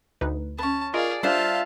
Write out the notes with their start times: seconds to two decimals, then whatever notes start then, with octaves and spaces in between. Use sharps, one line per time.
0.21 D2 D#4 B4
0.58 B3 C#4 A5
0.94 F4 G#4 A#4 D5 D#5 F5
1.23 G3 D4 F4 C5 E5 F5 A5